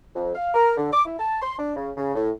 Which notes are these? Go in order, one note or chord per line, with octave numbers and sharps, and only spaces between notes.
F2
F5
A#4
D3
D6
E4
A5
C6
D4
C#3
C#3
A2